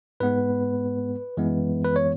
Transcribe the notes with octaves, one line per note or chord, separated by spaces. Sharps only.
G#2 G#3 B3 B4
F#2 E3 G#3 B3
B4
C#5